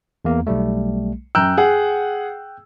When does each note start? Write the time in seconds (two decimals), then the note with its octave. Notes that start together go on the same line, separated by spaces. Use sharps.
0.25 E2 A#3
0.47 B1 G3 A3
1.35 F#2 G5 A#5 E6 F#6 G6
1.57 G#4 F#5